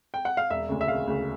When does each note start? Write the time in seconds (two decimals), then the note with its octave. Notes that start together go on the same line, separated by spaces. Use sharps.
0.14 G5
0.25 F#5
0.37 F5
0.50 E1 E5
0.69 D2 C#3
0.81 E5
0.88 E1 F5
1.07 D2 C#3